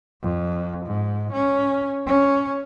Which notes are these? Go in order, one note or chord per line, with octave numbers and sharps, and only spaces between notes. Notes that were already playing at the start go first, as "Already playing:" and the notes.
F2
G#2
C#4
C#4